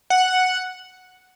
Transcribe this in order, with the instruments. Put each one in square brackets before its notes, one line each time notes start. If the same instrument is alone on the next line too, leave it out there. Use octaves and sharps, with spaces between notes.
[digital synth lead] F#5